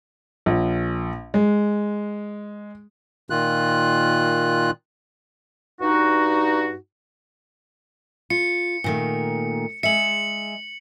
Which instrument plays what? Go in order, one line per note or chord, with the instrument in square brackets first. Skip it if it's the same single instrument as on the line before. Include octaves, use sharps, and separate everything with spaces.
[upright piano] A#1
G#3
[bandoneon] A#2 D#3 F4 F#6
[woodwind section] G2 D#4 F#4
[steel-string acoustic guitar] F4 [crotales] C#7
[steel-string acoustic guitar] A#2 D#3 A3
[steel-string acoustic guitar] G#3 E5 [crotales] C#7 F#7